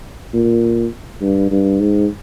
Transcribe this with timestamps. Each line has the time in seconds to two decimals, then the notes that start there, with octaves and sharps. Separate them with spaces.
0.34 A#2
1.21 G2
1.51 G2
1.80 G#2